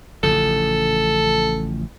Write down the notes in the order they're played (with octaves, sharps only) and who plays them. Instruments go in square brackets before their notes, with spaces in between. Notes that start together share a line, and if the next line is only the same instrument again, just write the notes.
[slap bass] A1 C#3 F3 [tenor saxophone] A4